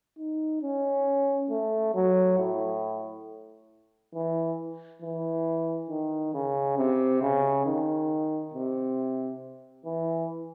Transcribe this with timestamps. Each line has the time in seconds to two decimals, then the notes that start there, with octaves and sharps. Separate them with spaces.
0.18 D#4
0.62 C#4
1.50 A3
1.94 F#3
2.38 A2
4.14 E3
5.02 E3
5.90 D#3
6.34 C#3
6.78 C3
7.22 C#3
7.66 D#3
8.54 C3
9.85 E3